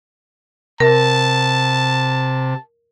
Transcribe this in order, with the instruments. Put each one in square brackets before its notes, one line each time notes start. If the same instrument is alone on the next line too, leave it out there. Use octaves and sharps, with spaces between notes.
[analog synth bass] C3 [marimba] A#4 [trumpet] A5